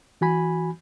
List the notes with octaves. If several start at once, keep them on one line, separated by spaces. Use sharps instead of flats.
E3 F#4 G#5 B5